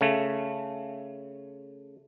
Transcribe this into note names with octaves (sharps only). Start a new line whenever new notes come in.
C#3 A3